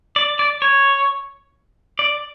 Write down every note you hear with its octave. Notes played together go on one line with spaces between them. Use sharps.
D5
D5
C#5
D5